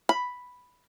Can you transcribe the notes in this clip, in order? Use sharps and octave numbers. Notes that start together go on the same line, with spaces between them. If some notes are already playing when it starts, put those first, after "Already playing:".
B5